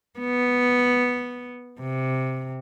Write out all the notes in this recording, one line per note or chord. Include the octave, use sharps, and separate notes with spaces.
B3
C3